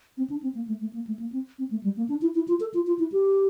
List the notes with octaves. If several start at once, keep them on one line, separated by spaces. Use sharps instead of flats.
C4
D4
C4
A#3
A3
A3
A#3
A3
A#3
C4
C4
A3
G3
A#3
D4
E4
E4
F4
A4
F4
F4
E4
G4